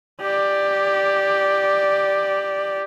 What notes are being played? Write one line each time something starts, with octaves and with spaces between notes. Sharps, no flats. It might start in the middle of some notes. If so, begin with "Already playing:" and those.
G4 D5